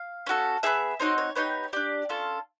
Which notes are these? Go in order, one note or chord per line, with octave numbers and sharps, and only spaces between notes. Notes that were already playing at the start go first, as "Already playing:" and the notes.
Already playing: F5
C#4 F#4 A4
B3 D#4 G#4 E5
C4 D#4 F#4 C#5
C#5
B3 D#4 G4 C#5
D4 G4 D5
C#4 F4 A4